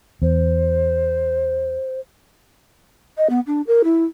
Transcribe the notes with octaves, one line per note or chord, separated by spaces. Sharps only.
E2 C5
D#5
B3
D4
A#4
E4